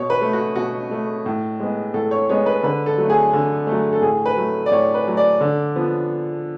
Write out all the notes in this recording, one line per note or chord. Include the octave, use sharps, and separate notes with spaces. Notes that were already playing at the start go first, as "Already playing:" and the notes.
Already playing: B2 C#5
B4
A3
F#4
B2 F#4
A3
A2
G#3 B3
A2 A4
C#5
G#3 B3 C#5
B4
D3 B4
A4
F#3 A3
G#4
D3
A3
F#3
A4
A2 G#4
B4
F#3 A3
D5
A2 C#5
B4
F#3 A3
D5
D3
F3 B3